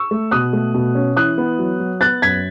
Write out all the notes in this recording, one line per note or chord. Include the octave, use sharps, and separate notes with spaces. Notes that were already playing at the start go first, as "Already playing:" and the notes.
Already playing: C#6 E6
A3
B2 D#6 F#6
A3
B2
C#4
E3 D#6 F#6
B3
F#3
F#3
B3 F#6 A6
F#2 G#6 B6